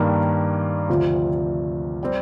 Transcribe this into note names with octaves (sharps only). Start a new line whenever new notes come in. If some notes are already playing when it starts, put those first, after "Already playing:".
Already playing: G2 D#3 A#3
D2 C3 F3 C4 F4
G3 C4